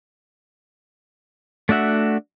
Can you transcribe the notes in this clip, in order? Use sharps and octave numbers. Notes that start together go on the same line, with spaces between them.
A3 D4 F#4 E5 F#5